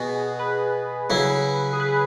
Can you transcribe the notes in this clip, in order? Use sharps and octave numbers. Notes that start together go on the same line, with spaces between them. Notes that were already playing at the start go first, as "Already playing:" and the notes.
Already playing: B2 B3 F#4 G#4
B4
C#3 F#3 E4
G#4
B4